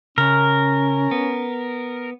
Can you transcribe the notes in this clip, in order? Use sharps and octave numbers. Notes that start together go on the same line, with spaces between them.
C#3 C#4 A#4
B3